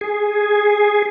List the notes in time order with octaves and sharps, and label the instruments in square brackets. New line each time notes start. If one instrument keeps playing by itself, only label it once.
[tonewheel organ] G#4